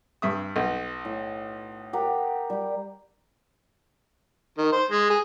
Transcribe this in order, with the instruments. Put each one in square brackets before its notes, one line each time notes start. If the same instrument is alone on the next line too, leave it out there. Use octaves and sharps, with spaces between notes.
[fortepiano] G2 E5 D#6
B1
[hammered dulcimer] A2
G4 A#4 F#5
G3 G4
[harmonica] D#3
C5
G#3
G#4